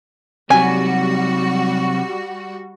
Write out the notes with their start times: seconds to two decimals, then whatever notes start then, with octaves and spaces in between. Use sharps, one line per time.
0.50 C3 F#3 G3 F#4 G#5